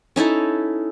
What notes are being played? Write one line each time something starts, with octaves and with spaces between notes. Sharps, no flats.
C#4 D#4 E4 A4